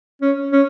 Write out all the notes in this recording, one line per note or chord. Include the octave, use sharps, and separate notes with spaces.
C#4
C#4